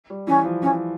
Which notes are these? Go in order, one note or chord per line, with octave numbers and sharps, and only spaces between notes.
G3
E3 C#4
F3
E3 C#4